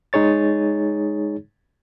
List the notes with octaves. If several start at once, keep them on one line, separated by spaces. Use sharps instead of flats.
G#3 D#4 G#4 C#5 A6